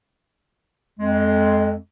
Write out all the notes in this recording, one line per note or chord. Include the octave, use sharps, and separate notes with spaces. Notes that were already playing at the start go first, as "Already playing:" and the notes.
F2 G#3